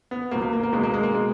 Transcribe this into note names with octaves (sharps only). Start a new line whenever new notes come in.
B3
C#2 B2 A#3
A#3
A#3
A#3
C#2 B2 G#3
A#3
G#3
A#3
B2 G#3